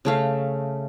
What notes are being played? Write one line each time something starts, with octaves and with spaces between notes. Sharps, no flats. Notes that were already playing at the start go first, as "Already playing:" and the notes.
C#3 A3 F5